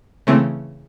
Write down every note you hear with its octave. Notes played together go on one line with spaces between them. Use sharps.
C#3 E3 A3 C4